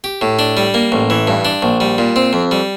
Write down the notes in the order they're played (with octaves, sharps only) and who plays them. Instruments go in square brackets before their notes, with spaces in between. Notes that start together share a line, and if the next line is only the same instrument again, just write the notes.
[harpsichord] G4
A2
D4
G3
A#3
A1
E3
G2
D4
A#1
G3
A#2
C4
F2
G3